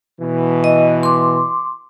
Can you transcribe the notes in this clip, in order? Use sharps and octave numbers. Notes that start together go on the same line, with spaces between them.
B2 E3
D#5
C6 D6